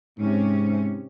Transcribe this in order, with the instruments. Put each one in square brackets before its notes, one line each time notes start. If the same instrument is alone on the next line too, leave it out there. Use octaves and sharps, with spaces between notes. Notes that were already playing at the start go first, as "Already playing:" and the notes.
[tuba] G#2 [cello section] C3 C#4